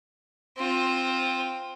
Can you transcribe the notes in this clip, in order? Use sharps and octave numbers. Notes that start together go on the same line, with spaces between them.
C4 F4